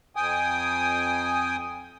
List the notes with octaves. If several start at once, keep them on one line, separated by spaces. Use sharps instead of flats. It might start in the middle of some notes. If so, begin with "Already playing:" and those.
F2 G5 G#5 D#6